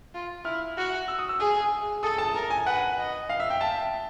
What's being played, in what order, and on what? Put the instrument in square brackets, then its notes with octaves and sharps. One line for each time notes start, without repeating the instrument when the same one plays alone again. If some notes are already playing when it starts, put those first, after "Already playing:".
[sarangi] F4
[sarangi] E4 [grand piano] F6
[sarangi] F#4
[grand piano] E6
D#6
E6
[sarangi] G#4
[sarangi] A4 [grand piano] D#6
[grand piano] A5
[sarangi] A#4 [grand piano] A#5
[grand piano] G#5
[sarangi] B4 [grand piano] F#5
[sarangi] D#5
[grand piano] F5
E5
G5
[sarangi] E5 [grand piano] A5